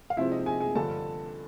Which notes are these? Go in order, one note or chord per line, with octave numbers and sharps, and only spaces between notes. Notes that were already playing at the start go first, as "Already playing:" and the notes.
F5
C3 F3 G#3 C4 E4 E5
D#4 D#5
G#4 G#5
G#4 G#5
G2 D3 F3 A4 A5